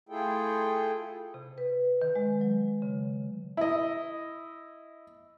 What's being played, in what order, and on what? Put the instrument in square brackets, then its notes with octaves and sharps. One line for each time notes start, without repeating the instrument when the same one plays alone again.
[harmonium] A3 E4 F4 G#4 A4 G5
[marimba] C3
B4
D#3
G#3
F#3
C#3
[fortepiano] E4 D#5